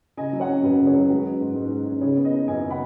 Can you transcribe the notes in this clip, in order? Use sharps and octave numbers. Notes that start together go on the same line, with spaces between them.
C#3 D#5 G#5
F#3
C#5 F#5
C#4
F#2 F#4 B4
C#3
G#4 C#5
F#3
G#3 F#4 B4
C#4
G#2
G#2
G#3
C#4
C#3 G#4 C#5
B3
B4 D#5
D#4
F#2 D#5 G#5
C#3
F#5 B5